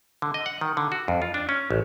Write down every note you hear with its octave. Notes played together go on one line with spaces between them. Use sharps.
D3
D#5
F#5
D#3
D3
F#4
F2
F4
D4
C#4
A1